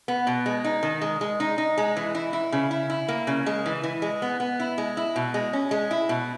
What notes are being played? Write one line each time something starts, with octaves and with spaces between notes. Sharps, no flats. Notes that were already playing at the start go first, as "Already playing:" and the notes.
B3
B2
G#3
D#4
D#3
G#3
G#3
D#4
D#4
G#3
E3
E4
E4
C#3
E4
E4
A#3
C#3
G#3
E3
E3
G#3
B3
B3
E4
G#3
E4
B2
G#3
C#4
G#3
E4
B2